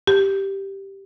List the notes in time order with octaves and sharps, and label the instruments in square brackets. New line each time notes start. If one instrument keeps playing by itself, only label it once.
[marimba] G4